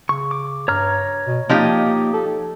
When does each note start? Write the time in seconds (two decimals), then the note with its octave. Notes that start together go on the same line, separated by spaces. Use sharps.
0.09 C#3 C#6
0.31 D6
0.68 G2 C#5 A#5 F6
1.27 B2
1.49 F3 A#3 D#4 G4
2.13 A4